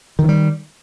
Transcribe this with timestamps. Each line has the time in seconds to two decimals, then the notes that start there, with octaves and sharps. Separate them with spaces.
0.19 D#3
0.24 E3
0.29 G3